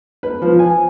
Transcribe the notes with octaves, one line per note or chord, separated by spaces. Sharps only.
B4
F3
G#5